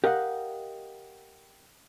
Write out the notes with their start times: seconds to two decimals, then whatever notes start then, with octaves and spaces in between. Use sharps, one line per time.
0.04 G4 A#4 D#5 F5 F#5